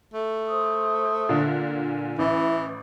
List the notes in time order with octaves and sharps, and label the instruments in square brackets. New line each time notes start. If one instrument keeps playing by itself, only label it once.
[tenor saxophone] A3
[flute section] C5 C6 D#6
[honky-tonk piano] A#2 D3
[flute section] G#5
[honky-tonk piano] A1 [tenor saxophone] E3 [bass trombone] E4